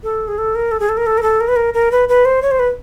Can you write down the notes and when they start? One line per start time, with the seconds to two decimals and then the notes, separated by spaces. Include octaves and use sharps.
0.03 A4
0.28 G#4
0.38 A4
0.55 A#4
0.71 A4
0.80 G#4
0.89 A4
0.97 A#4
1.06 A4
1.18 A#4
1.23 A4
1.41 A#4
1.48 B4
1.56 A#4
1.74 A#4
1.92 B4
2.09 B4
2.25 C5
2.42 C#5
2.51 C5
2.59 B4